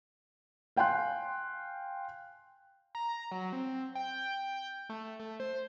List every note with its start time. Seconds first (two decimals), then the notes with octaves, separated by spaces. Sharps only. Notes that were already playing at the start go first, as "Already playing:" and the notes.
0.76 F5 G5 G#5 C6 F#6
2.95 A#5
3.31 F#3
3.53 C4
3.95 G5
4.23 G5
4.90 A3
5.20 A3
5.40 C5